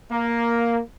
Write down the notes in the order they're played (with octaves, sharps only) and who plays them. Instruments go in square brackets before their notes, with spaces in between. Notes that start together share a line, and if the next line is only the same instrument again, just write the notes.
[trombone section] A#3